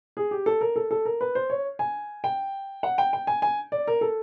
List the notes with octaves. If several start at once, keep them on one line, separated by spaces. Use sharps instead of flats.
G#4
G4
A4
A#4
A4
A4
A#4
B4
C5
C#5
G#5
G5
F#5
G5
G5
G#5
G#5
D5
A#4
A4